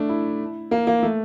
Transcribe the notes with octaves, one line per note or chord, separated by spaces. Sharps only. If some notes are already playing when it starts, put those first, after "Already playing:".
Already playing: A3 D4
E4
A#3
A#3
A3